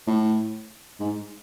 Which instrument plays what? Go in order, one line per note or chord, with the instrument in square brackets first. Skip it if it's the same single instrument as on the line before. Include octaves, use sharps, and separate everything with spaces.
[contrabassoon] A2
G#2